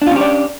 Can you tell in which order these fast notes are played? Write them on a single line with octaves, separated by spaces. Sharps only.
D4 F4 C#4 G4 D5